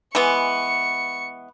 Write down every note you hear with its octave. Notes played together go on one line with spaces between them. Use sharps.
E3 G#3 B3 C#6 C#7